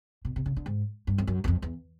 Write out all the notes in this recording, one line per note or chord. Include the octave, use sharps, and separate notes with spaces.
B2
C3
C#3
D3
G#2
G2
F2
F#2
F#2
F2
E2